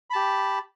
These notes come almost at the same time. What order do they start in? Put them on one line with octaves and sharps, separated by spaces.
B5 A5 G4